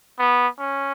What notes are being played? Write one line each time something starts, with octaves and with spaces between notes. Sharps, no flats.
B3
C#4